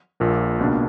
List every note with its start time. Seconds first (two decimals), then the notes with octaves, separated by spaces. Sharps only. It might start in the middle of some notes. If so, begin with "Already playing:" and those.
0.20 A#1 A#2 A#3
0.59 C#2 B2 A#3 D4